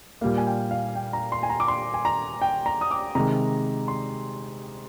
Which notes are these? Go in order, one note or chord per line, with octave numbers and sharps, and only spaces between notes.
A#2 G3 A#3 F5
G#5
G5
F5
G5
A#5
C6
G#5
A#5
D6
C6
G#5
A#5
G5
A#5
D#6
D6
C3 D#3 G#3 A#5
C6